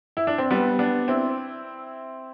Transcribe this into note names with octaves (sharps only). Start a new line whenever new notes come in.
E4
D4
C4
G3 B3
B3 D4
C4 E4